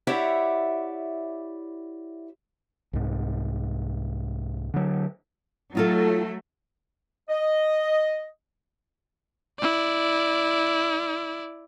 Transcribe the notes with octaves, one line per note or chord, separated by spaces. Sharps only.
E4 G4 C#5 D5 E5 F#5
C2 G#2
D3 F#3
F#3 A3 D#4 F4 A4
D#5
E4 D5